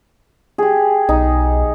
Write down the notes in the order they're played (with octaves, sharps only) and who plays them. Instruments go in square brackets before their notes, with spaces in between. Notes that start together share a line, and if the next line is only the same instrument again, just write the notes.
[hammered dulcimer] G4 G#4
[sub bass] B1 [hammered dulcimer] D#4